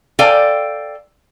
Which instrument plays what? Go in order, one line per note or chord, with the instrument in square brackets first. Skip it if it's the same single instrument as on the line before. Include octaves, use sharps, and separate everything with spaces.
[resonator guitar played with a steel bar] A4 C5 D5 F5 G5 G#5